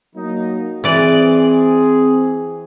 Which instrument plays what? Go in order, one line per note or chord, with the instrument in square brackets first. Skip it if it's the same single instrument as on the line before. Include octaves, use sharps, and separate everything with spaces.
[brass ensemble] F#3 A#3 D#4
[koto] E3 D5 [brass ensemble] C4 G#4